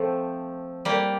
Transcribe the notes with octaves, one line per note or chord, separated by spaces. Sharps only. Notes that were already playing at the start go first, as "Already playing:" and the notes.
Already playing: F3 A3 C4
G3 A#3